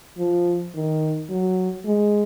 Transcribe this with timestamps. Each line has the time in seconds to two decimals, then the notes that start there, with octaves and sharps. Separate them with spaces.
0.19 F3
0.75 D#3
1.30 F#3
1.86 G#3